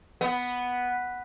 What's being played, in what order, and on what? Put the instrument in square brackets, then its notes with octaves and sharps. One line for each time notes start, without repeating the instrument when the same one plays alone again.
[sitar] B3